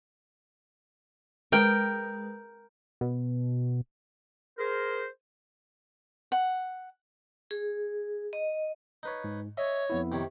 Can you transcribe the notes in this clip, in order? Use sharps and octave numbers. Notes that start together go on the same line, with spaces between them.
G#3 A#4 B4 G5
B2
G#4 A#4 C5
F#5
G#4
D#5
D#4 B4 C#5
G#2
C#5 D#5 E5
F2 B3 E4
C3 D#3 C#5